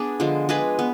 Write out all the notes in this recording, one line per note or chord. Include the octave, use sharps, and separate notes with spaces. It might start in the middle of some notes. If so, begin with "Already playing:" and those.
Already playing: B3 D4 G#4
D3 F3 G#3
G#3 D4 G#4 B4
B3